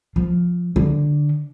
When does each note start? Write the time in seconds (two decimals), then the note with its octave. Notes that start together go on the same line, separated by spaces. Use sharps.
0.16 F3
0.76 D3